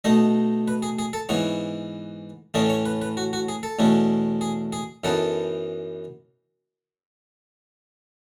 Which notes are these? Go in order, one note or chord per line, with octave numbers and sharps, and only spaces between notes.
B2 A3 D#4 D#5
B4
G#4
G#4
A4
G#2 E3 B3 E4 C#5
A2 E3 A3 C#4 E4 D#5
C#5
B4
B4
F#4
F#4
G#4
A4
E2 B2 A3 C#4 E4
G#4
G#4
F#2 E3 B3 D#4 A4